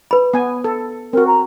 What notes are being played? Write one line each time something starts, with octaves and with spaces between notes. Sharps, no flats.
B4 B5
B3 G#5
A4
C4 F#4 A#4
A#5